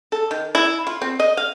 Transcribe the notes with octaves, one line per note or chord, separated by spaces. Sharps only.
A4
D#3
E4
F4
C4
D#5
F5